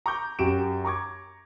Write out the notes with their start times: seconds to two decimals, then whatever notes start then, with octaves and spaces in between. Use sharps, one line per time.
0.06 A#5 C#6 D6 G6
0.39 F#2 F#4 G4 D7 E7
0.85 A#5 C#6 D6 G#6